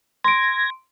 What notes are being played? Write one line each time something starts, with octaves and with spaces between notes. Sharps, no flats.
C6 G#6 A#6 D7